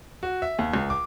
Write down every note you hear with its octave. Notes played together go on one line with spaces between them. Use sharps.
F#4
E5
D#2
C#2
D6